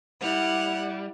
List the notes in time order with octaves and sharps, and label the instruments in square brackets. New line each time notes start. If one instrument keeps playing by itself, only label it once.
[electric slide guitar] G3 [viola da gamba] E4 [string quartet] F#5 [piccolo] F7